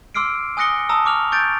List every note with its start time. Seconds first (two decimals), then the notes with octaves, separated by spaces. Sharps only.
0.15 C6 D6 E6 F6 C7 D7
0.57 G#5 D#6 F#6 A#6 C#7 G7
0.89 A5 A#5 D#6 E6
1.05 C#6 D6 F6 F7
1.32 C#6 G6 A6 D7